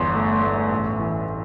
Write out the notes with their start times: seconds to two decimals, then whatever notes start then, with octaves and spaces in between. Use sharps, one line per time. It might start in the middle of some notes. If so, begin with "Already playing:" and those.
Already playing: G1 E2 C6
0.15 A3
0.43 A3
0.70 A1
0.99 E3